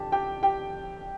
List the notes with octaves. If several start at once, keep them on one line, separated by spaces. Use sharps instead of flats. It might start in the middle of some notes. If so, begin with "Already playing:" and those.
Already playing: F2 D3 G4 A5
G4 G5
G4 G5